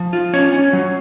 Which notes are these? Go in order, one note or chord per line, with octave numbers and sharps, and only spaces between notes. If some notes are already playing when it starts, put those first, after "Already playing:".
Already playing: F3
F4
C#4 C#5
C#4
F#3